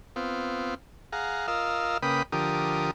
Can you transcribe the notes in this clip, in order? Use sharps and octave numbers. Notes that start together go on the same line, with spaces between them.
B3 C4 F4
G#4 F5 F#5 A#5
F4 A#4 D#5 F5 E6
C#3 A#3 B4 G5 B5 D#6
D3 F3 G4 A#4 D#6